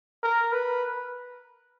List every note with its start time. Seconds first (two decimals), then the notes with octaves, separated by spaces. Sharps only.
0.23 A#4
0.53 B4